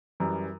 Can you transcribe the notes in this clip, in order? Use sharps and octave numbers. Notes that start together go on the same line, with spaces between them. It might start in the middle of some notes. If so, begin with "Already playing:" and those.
F#2 E3 G3